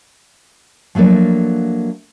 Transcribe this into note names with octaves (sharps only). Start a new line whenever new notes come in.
F3 F#3 A3 A#3 D4